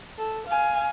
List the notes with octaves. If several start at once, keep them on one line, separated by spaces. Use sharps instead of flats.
A4
F5 G#5